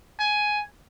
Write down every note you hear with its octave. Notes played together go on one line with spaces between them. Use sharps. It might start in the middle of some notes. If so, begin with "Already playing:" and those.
G#5